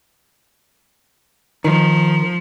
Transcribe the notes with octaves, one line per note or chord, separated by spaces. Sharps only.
D#3 F3